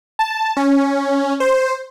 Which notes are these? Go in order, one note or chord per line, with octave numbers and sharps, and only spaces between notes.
A5
C#4
C5